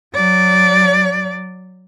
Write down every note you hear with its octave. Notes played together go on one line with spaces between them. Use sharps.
F#3 D5